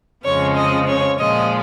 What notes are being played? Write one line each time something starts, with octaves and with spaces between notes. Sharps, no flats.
F2 C#3 F3 G#3 C#5
D#5
C#5
A#2 F3 G#3 D#5